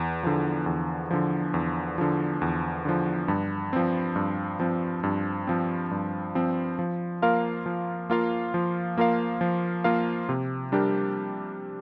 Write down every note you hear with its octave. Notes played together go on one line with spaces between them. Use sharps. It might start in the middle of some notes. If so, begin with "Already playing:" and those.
Already playing: E2
D3 F3
E2
D3 F3
E2
D3 F3
E2
D3 F3
G2
F3 C4
G2
F3 C4
G2
F3 C4
G2
F3 C4
F3
A#3 F4 A#4 F5
F3
A#3 F4 A#4 F5
F3
A#3 F4 A#4 F5
F3
A#3 F4 A#4 F5
C3
G3 D4 G4 A#4